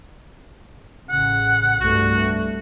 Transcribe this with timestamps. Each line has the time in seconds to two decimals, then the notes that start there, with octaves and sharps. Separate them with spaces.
1.10 A1 C#3 F#5
1.81 C2 G2 A3 F#4